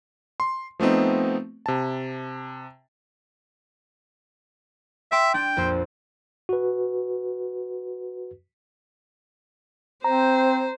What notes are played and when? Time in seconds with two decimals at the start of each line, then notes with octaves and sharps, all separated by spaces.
0.40 C6
0.79 F3 A3 B3 C4 D#4
1.66 C3 A5
5.12 E5 G5 C6 D6
5.34 D4 G5
5.57 A#1 F2 C5
6.49 F#4 B4
10.04 C4 C5 A#5